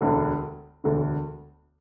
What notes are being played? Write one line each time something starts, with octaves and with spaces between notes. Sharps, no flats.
E1 D2 D3
E1 D2 D3